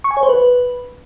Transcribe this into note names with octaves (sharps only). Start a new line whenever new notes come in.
C#6
G#5
C#5
C5
B4